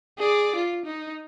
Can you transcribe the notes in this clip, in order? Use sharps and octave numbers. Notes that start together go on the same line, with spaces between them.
G#4 D5
F4
D#4